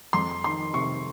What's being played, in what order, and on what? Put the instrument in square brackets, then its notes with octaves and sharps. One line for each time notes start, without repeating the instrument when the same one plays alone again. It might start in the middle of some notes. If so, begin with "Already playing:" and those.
[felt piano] F2 C6
D#3 C6
C3 C#6